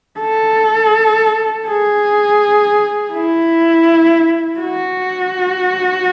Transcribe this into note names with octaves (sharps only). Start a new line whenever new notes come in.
A4
G#4
E4
F#4